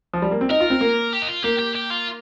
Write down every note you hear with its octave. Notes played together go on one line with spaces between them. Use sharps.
F3
G3
A#3
C4
D#4 A#4
F4
C4
A#3
G4
D#4
F4
A#3 G4
G4
G4
F4